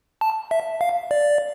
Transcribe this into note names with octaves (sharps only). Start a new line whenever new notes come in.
A5
E5
F5
D5